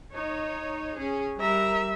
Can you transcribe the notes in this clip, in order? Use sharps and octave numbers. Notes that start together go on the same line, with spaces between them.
D#4 C#5
C#4 G#4
G3 A#4 E5 A#5